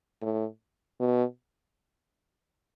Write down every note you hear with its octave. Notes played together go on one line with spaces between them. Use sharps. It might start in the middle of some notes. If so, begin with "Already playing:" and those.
A2
B2